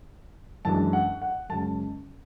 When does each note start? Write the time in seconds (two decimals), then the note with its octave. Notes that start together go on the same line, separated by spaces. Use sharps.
0.65 F#2 E3 G#3 D4 A5
0.93 F#5
1.22 F#5
1.49 F#2 C#3 G#3 C#4 A5